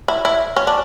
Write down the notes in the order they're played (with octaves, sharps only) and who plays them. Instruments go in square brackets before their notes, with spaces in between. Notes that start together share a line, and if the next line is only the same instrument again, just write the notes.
[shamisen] E4
E4
C#4
D4